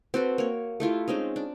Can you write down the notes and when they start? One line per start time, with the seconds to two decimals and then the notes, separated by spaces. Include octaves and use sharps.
0.14 C4 F#4 A4 B4
0.38 A#3 C#5
0.80 A3 E4 F4 G4
1.08 G#3 C4 C#4 D#4
1.36 D4